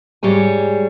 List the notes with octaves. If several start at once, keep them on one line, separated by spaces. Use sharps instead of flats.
G#2 G3 G#4 C#5 G#5